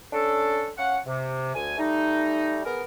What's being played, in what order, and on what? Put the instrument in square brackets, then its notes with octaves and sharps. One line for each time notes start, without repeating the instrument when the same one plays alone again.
[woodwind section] C#4 D4 A4
C#4 F5 F#5
C3
D2 G#5
G3 A3 D#4
B3 G#4 A#4